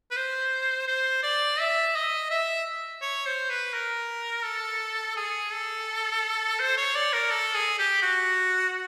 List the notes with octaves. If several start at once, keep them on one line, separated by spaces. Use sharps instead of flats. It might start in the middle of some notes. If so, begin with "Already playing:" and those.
B4
C5
C5
D5
E5
D#5
E5
C#5
C5
B4
A#4
A4
G#4
A4
C5
C#5
D5
A#4
A4
G#4
G4
F#4